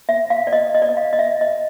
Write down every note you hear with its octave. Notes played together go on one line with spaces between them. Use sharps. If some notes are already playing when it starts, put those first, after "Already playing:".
E5
F5
D5
D#5
D#5
D5
D#5
F5
D#5
E5
D#5